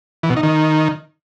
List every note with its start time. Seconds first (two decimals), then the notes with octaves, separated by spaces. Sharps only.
0.23 E3
0.30 B2
0.37 D#4
0.43 D#3